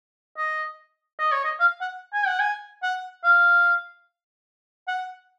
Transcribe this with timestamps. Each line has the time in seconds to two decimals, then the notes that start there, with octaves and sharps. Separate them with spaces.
0.37 D#5
1.19 D#5
1.32 C#5
1.44 D#5
1.60 F5
1.81 F#5
2.14 G#5
2.27 F#5
2.40 G#5
2.83 F#5
3.24 F5
4.88 F#5